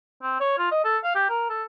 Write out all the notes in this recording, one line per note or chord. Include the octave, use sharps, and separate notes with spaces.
C4
C#5
F4
D#5
A4
F5
G4
A#4
A4